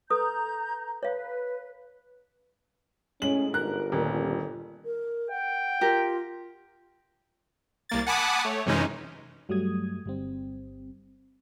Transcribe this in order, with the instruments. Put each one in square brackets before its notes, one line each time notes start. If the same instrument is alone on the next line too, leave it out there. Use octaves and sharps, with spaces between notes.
[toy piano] A4 B4 D#6 [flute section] A#5 G6
[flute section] B4 [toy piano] C#5 F5
[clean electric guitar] A2 G#3 [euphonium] C#4 [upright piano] F#7
[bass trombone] G1 [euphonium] G#2 [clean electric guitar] A#4 [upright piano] F#6
[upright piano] D#1 [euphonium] A#2
[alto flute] A#4
[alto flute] F#5 [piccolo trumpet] G5
[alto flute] F4 [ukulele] G4 A#4
[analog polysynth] C2 A#3 A6
F#5 G#5 A5 B5 D6 D#6
A3 C#5
F#2 C3 E3 G#3 C#4 D#4
[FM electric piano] G2 F#3 G3 A3 D#6 G#6
G1 G3 C4